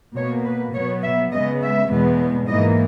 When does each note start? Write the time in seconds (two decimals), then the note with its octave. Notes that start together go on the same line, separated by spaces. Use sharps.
0.16 B2 A#3 C#5
0.45 B4
0.73 B2 F#3 B3 C#5
1.02 E5
1.32 C#3 G#3 B3 D#5
1.61 E5
1.89 E2 B2 G#3 B3
2.47 G#2 E3 A#3 D#5